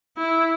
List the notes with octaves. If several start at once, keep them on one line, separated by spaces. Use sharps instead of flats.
E4